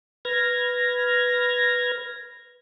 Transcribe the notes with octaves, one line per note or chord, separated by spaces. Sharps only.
B4 F6 G#6 A#6